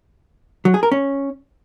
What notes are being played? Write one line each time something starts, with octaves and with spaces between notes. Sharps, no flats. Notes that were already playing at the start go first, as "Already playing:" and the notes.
F#3
G#4
A#4
C#4